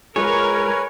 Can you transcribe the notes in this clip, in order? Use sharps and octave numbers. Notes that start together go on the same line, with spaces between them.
G#3 F4 G#4 A#4 B4 C#5 G#5